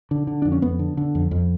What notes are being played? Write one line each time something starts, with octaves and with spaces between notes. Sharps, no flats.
D3
D3
F2 D4
C#4
F2 B3
D3
D3
F2
F2